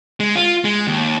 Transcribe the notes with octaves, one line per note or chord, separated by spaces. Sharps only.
G#3
F4
G#3
D#2